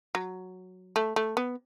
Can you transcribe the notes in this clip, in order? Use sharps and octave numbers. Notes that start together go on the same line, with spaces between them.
F#3
A3
A3
B3